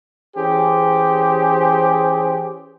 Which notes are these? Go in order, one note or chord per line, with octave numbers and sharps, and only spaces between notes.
E3 C#4 G4 G#4 C5